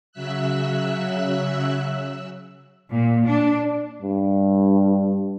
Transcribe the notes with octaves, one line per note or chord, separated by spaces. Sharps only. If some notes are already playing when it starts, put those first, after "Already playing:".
C#3 F#3 E5 E6 F#6
A#2
D4
G2